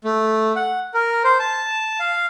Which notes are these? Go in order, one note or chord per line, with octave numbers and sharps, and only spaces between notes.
A3
F#5
A#4
C5
A5
F5